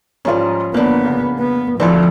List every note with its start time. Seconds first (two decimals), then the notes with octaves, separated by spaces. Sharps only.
0.25 G#2 F3 G3 C#4 F4
0.74 G1 A#3 B3 D4
1.05 C#3
1.39 B3
1.80 D2 F3 A3 C4 D4 E4 A4